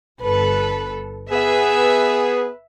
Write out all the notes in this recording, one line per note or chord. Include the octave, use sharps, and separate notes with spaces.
G1 A4 B4
B3 G#4 B4 E5